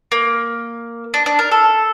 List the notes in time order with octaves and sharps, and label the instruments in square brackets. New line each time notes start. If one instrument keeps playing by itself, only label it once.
[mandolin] A#3
D4
D4
A#4
A4